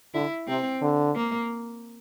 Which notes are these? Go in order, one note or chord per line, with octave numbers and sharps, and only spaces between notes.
D3 E4
C3 C4
D3
A#3